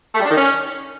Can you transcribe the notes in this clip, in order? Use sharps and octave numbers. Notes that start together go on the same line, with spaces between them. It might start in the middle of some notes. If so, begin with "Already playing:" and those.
A3
G3
D4
D#3
C#4